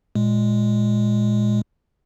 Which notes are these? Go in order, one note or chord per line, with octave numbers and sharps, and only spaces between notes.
A#2 G#3